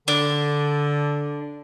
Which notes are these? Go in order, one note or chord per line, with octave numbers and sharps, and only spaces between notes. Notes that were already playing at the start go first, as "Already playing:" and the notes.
D3 D4